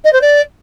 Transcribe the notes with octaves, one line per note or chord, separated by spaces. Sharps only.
D#5
C5
D5